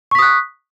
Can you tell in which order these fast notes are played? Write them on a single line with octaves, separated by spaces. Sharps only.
C#6 B6 D#6 F#6